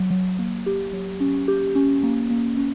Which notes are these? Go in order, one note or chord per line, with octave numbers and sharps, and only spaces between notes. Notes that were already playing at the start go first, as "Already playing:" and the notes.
Already playing: F#3
F#3
A#3
G4
F#3
C#4
G4
C#4
A#3
A#3
C#4